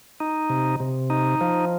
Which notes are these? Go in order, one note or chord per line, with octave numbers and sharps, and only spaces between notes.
D#4
C3
C3
D#4
F3